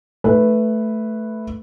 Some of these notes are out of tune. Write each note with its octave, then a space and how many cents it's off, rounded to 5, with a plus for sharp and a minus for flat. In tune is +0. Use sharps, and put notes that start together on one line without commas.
A3 +0 B4 +0